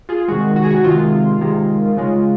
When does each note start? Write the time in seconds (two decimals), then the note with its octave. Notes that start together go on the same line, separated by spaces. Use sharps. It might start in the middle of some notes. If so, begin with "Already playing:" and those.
0.09 F4 G#4
0.28 C3 D#3 G#3 F#4
0.56 F#4
0.64 G#4
0.70 F#4
0.84 C3 D#3 G#3 F4
1.41 C3 D#3 G#3
1.97 C#3 G#3